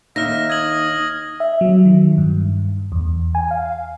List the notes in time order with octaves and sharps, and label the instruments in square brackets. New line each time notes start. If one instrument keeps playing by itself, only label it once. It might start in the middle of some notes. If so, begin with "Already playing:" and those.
[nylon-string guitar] D#2 D#4 [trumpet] E5 [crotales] F6 A#6
[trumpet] D#6 [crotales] G#6 F#7
[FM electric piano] E5
F#3
D#3
G2
E2
G#5
F5